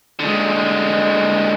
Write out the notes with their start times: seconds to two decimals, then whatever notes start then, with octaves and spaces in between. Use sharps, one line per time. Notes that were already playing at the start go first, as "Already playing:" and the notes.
0.20 D3 G#3